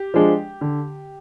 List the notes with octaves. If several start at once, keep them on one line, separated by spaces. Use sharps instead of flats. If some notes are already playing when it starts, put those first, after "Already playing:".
Already playing: G4
F3 G#3 D4
D3